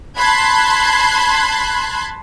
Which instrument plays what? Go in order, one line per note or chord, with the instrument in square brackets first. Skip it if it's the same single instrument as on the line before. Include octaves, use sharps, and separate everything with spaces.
[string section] A5 B5 C6 F#6 G#6